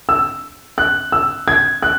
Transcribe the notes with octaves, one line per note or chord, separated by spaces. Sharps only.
E6
F#6
E6
G#6
F#6